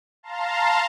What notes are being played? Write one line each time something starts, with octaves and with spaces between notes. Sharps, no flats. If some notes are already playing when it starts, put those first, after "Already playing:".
F5 A5 A#5 C6